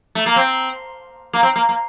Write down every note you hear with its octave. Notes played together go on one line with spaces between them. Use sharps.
A3
A#3
C4
A#3
C4
A#3
A#3